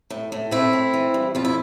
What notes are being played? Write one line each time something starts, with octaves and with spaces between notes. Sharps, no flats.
A2
A2
A3 C4 E4
A3
E3
G2
F2 F4
E4